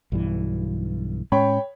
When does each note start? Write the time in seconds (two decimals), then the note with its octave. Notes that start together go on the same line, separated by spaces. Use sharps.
0.12 B1 G2 E3
1.32 A2 G#3 C#4 C#5 G5 B5